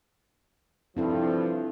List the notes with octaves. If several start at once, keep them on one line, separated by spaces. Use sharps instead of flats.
G2 F3 C4 E4 A4